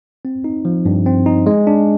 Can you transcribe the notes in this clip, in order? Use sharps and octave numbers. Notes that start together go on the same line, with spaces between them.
C4
D#4
F3
G2
C4
D#4
G#3
D4